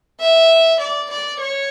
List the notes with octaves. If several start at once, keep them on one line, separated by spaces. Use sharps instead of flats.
E5
D5
D5
C#5